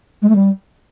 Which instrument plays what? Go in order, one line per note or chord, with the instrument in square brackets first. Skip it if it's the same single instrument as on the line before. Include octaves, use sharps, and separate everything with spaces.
[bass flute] G#3
A3
G3